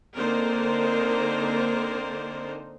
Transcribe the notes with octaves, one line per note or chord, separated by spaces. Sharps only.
D3 A#3 C4 D#4 A#4 C5